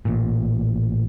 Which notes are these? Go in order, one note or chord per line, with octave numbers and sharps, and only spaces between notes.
A1 A#2